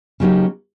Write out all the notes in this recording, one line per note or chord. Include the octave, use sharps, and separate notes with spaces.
C#3 F#3 A#3 D#4 G4